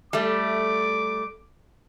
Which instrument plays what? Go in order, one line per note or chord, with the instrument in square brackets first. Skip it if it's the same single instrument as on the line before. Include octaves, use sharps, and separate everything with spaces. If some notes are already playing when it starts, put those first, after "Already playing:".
[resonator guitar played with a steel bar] G3 A3 [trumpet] D6